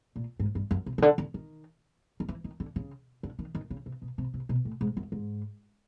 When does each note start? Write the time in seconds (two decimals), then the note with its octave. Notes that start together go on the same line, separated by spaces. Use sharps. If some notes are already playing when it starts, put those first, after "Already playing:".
0.16 A#2
0.39 G#2
0.55 G2
0.71 F#2
0.86 C3
0.98 C#3
1.02 D3
1.18 D3
1.34 D#3
2.20 D#3
2.28 E3
2.44 D#3
2.60 D3
2.76 C#3
3.23 D3
3.39 D#3
3.55 D#3
3.70 C#3
3.86 C3
4.02 B2
4.18 C3
4.34 C3
4.49 B2
4.65 A2
4.81 G#2
4.97 F#2
5.12 G#2